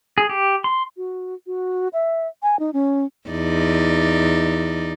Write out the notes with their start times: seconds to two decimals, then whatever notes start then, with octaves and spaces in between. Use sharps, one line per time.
0.18 G#4
0.29 G4
0.64 C6
0.97 F#4
1.47 F#4
1.93 E5
2.43 G#5
2.59 D#4
2.73 C#4
3.29 E2 D#4 D5